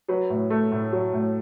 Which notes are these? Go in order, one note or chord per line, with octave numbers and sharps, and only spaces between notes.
F#3 B4
A2
A3
A2
F#3
A2